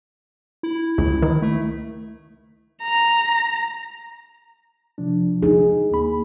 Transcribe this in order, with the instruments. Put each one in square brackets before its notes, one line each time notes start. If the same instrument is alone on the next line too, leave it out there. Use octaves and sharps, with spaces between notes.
[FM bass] E4
[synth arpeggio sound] C#2
D#3
[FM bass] A3
[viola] A#5
[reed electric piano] C3 F3 D4
[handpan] D#4 G#4
[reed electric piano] D#2 A#3 B5